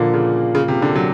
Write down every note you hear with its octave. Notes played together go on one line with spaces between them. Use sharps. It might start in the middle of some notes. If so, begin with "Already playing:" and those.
Already playing: A#2 D3 F3 A#3
C#3
C#3
C3
D3
F#3